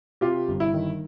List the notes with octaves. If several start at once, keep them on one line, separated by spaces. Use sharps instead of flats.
C3 F4 G4
G1
E4
D#3